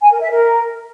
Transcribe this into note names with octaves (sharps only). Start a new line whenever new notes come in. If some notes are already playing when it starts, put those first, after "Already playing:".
G#5
A#4
E5
A#4